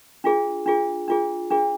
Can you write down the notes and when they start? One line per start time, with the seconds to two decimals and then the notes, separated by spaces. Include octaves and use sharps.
0.24 D4 F4 G#4
0.66 D4 F4 G#4
1.08 D4 F4 G#4
1.51 D4 F4 G#4